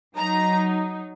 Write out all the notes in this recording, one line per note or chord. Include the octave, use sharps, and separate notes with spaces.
F#3 D#4 A#5